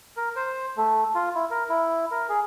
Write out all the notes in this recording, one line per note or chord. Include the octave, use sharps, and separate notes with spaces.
A#4
C5
A3
F4
E4
A#4
E4
A#4
G#4